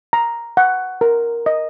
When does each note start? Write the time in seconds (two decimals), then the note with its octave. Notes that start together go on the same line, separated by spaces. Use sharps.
0.13 A#5
0.57 F#5
1.01 A#4
1.46 D#5